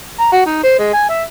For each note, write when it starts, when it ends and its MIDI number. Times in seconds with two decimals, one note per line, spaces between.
0.20 0.27 82
0.32 0.42 66
0.46 0.58 63
0.63 0.78 72
0.79 0.93 56
0.94 1.06 80
1.09 1.24 76